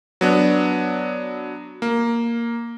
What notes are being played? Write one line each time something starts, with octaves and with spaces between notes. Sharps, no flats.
F#3 B3 D4
A#3